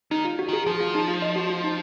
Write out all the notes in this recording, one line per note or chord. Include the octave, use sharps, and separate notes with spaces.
D#3 D#4
F4
F#4
D#3 G#4
F3 G#4
F4
D#4
F4
D#5
F#4
F4
D#4